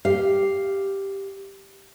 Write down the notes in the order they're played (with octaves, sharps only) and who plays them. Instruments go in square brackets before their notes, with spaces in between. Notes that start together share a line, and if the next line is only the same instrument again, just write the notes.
[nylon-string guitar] G4 F5